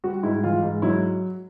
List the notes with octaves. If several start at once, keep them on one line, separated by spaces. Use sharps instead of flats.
G3 F#4
G#2 E4
E3 F4
G#2
F#3 E4